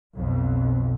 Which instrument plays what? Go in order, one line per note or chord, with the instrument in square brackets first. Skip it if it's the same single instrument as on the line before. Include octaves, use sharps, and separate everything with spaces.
[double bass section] B1 F2 B2